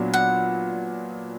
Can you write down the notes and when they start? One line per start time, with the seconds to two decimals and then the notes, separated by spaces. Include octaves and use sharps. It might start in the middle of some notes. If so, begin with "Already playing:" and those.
Already playing: A#2 F#3 B3 D4
0.14 F#5